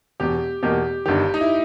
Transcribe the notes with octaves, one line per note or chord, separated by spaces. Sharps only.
E1 E2 B2 G4
E2 B2 A#3 D#4 G4
G1 G2 D#3 G4
D#4
E4